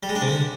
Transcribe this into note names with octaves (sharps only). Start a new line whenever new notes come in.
G3
G#3
D4
C3
D3